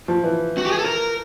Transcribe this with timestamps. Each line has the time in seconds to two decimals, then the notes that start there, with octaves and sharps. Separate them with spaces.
0.08 F3
0.24 E3
0.58 F#4
0.65 G4
0.71 G#4
0.79 A4
0.85 A#4